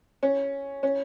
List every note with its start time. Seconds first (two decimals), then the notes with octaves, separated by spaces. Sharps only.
0.23 C#4
0.83 C#4